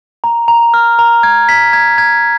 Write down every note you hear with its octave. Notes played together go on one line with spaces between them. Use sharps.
A#5
A#5
F6
A#5
G#6
B6
G#6
G#6